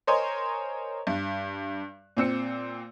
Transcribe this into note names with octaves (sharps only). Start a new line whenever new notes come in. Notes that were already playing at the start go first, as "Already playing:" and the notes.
A#4 C5 C#5 D#5 G#5 C6
G2
A#2 C4 E6 C#7